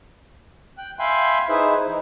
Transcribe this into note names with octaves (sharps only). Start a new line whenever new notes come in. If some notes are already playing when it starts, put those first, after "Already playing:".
G5 F#6
E5 F5 G5 G#5 B5 C6
D#4 E4 G#4 B4 C5 E5
E3 D#4 E4